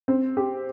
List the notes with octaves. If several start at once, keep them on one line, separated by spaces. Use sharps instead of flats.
C4
G4